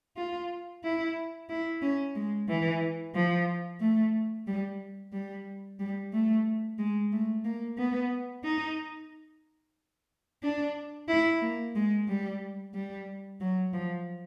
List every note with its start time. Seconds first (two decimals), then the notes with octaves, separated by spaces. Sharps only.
0.17 F4
0.83 E4
1.49 E4
1.82 C#4
2.16 G#3
2.48 E3
3.15 F3
3.81 A3
4.47 G3
5.13 G3
5.79 G3
6.13 A3
6.79 G#3
7.12 A3
7.45 A#3
7.78 B3
8.44 D#4
10.43 D4
11.09 E4
11.42 A#3
11.75 G#3
12.08 G3
12.74 G3
13.41 F#3
13.74 F3